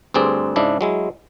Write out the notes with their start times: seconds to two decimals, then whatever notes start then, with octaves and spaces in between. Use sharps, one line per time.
0.14 D2 G2 C4 G#4 D5
0.56 G#2 C#3 D4 E4
0.81 F#3 G#3 E4